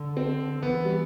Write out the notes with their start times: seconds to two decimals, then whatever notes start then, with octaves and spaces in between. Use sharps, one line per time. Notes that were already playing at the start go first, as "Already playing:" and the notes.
Already playing: D3
0.17 C4
0.62 E3 B3
0.85 G3